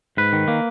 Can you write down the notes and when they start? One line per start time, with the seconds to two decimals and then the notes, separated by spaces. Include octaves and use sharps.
0.17 G#2 B4
0.33 D#3
0.48 A#3